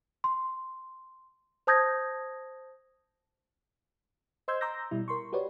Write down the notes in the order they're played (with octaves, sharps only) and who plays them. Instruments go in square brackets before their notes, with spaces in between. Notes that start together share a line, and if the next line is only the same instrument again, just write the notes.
[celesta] C6
C5 A5 D#6 G6 G#6 A#6
[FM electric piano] C5 D#5 C6 E6 G6 G#6
A#5 C6 D6 E6 G6 A#6
B2 G3 E4
A#4 C6 C#6
F#4 G4 B4 C#5 D5